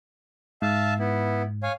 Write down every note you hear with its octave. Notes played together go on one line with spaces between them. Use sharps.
G#2 E5 F5 A5
B3 E4
C#5 F5 G#5